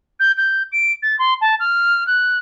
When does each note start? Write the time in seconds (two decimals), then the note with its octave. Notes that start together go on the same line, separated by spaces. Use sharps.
0.20 G6
0.37 G6
0.72 D7
1.02 A6
1.19 C6
1.41 A5
1.60 F6
2.07 F#6